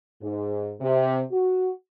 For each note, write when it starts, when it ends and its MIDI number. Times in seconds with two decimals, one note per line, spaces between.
0.22 0.72 44
0.80 1.20 48
1.31 1.69 66